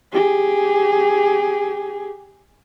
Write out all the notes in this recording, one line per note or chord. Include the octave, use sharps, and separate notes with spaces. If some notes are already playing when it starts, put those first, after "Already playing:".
G4 G#4